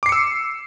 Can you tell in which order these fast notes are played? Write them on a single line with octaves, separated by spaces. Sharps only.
D6 C7 C#7 E6